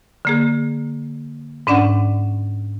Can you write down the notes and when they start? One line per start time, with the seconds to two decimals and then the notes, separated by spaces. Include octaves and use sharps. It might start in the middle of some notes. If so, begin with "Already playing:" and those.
0.25 D3 A#3 G#4
1.67 G#2 C#4 D4 D5 F#5